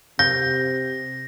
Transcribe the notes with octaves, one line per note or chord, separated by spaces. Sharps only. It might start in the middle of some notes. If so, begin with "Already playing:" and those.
C3 G6 A#6